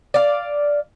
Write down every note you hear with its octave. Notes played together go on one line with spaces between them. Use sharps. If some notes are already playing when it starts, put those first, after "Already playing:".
D5 F5